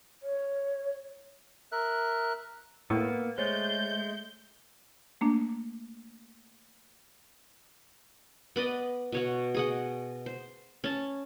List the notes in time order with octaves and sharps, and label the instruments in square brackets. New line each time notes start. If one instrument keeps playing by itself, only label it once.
[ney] C#5
[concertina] A#4 E5 F#6
[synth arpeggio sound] A2 [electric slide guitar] A#3 B3 [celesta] E6
[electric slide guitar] G#3 A3 [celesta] C5 C#5 A6 [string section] G6
[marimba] A3 A#3 D4
[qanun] B3 B4 D5 D#5
B2 C#5 F#5
G#4 D#5 F#5
C5
C#4 A5